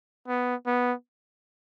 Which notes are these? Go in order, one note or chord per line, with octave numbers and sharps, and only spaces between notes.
B3
B3